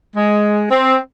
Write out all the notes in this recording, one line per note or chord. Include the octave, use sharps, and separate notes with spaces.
G#3
C4